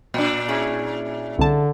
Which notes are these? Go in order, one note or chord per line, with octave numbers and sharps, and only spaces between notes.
A#2 D4
C#4 E4 G#4
C2 D3 A5